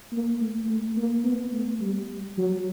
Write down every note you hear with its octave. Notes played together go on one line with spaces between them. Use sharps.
A#3
A3
A3
A#3
B3
A3
G3
F#3